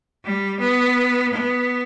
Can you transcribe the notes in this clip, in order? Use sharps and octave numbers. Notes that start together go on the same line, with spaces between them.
G3
B3
B3